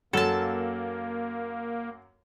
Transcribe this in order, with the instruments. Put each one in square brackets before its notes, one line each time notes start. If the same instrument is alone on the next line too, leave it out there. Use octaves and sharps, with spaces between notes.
[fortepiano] F#2 [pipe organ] A#3 [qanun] A4 A5